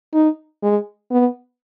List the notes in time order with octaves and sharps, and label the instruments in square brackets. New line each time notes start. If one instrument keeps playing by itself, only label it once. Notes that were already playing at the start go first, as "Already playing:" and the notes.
[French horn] D#4
G#3
B3